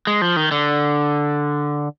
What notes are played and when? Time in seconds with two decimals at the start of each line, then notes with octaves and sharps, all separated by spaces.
0.07 G#3
0.22 F3
0.36 D#3
0.51 D3